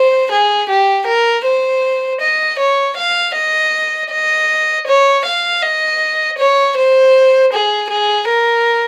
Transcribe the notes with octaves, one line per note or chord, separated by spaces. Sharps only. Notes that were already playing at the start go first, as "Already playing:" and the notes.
Already playing: C5
G#4
G4
A#4
C5
D#5
C#5
F5
D#5
D#5
C#5
F5
D#5
C#5
C5
G#4
G#4
A#4